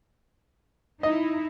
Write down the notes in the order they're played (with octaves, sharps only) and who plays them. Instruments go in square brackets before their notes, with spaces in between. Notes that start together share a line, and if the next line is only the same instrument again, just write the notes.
[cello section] D#4 E4 [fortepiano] D#5